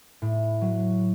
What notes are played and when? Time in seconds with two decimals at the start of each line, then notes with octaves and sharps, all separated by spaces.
0.22 A2
0.61 F#3